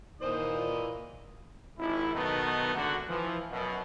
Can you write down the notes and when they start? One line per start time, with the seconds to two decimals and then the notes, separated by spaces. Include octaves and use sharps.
0.21 D#2 A#2 E3 C5 D#5 D#6
1.78 G#1 E4
2.15 B2 D#3 F#3 A3 B3 D#4
2.75 G#1 D2 D3 F#4
3.08 E3 F3
3.51 F#2 B2